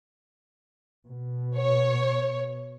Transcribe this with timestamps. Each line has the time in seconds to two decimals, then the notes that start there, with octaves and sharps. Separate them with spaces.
1.08 B2
1.57 C#5